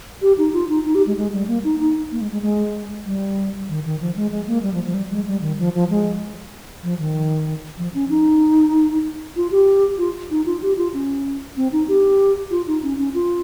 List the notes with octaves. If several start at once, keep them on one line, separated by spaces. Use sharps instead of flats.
G4
D#4
F4
D#4
D#4
G4
G#3
G#3
G3
A#3
D#4
D#4
A#3
G#3
G#3
G#3
G3
D#3
D#3
F3
G#3
G#3
A#3
G3
F3
F3
G3
G#3
G3
D#3
F3
F3
G#3
F3
D#3
F3
C#4
D#4
F4
G4
F4
D#4
F4
G4
F4
C#4
C4
D#4
G4
F4
D#4
C#4
C#4
F4